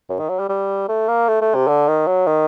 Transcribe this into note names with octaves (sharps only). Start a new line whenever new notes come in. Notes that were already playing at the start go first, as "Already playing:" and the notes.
F#2
D#3
F#3
G3
G3
A3
A#3
A3
A3
C3
D3
D#3
F#3
D#3